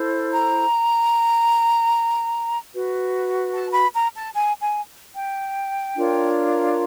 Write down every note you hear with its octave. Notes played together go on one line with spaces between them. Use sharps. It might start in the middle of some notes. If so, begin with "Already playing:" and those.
Already playing: E4 A4 C5
A#5
F#4 B4
A5
B5
A#5
A5
G#5
G#5
G5
D4 F4 A#4 C#5